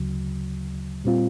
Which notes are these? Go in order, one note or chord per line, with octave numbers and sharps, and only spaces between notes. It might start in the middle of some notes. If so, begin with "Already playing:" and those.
Already playing: D2 C#3 F#3
A#2 G3 C4 F4